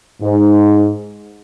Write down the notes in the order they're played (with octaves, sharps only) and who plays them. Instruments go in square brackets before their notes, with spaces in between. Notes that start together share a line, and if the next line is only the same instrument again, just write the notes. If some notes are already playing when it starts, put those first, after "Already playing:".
[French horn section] G#2